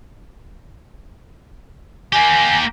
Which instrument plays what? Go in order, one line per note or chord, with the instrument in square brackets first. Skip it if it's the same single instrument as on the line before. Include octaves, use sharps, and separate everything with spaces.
[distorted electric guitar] A#3 G4 [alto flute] G#5